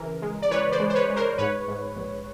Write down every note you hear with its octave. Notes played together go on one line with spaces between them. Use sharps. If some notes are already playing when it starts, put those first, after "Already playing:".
Already playing: C#3 E3 A#4
G#3
D5
E3 B4 C#5
C5 D5
G#3
C5
B4 C#5
G#3
A#4 C5
G#2 B4 C#5
G#2
A#1